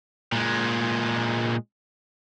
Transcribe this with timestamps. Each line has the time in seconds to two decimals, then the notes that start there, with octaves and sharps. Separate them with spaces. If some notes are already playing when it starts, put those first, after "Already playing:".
0.32 A#2 G#3